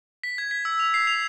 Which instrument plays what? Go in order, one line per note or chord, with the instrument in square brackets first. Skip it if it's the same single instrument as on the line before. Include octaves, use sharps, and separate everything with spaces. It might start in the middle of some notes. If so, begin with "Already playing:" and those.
[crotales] B6
G#6
B6
E6
F7
C7
F7